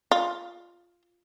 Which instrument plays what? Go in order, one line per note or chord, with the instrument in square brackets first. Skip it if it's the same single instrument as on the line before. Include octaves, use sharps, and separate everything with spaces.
[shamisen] F4